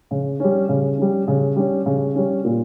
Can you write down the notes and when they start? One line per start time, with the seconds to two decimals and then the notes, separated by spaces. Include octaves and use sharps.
0.11 C#3
0.40 G3 C#4
0.69 C#3
0.98 G3 C#4
1.28 C#3
1.56 G3 C#4
1.86 C#3
2.15 G3 C#4
2.44 A#2